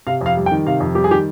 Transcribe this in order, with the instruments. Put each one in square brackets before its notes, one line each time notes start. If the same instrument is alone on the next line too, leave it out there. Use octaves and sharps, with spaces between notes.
[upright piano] C3 F5
F2 F5
G3
G5
D#3
C3 F5
F2
G3 G4
G#4
D#3 G4